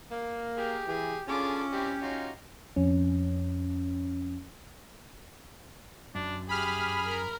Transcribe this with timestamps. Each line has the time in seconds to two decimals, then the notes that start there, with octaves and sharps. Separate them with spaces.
0.12 A#3
0.57 G4 G#4 A#4
0.88 E3 G#4
1.28 D3 C#4 F4 G#4 A5 D6
1.72 G3 C4 E4 G4
2.03 D#4 F4 F#4
2.76 F2 C#4
6.15 F#2 D4
6.49 G4 G#4 B5 F6
7.06 A#4 A#5